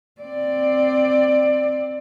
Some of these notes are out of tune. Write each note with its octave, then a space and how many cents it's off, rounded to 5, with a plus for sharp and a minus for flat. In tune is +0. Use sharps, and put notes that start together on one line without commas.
C4 +0 D5 +15